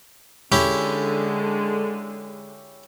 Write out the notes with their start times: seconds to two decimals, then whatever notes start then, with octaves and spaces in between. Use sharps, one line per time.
0.52 D3 G#3 C#4 E4 G4